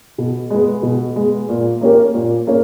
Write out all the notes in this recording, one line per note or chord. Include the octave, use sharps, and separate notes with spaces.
B2
G#3 B3
B2
G#3 B3
A#2
A#3 C#4 G4 A#4
A#2
A#3 C#4